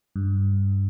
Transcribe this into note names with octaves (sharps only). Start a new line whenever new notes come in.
G2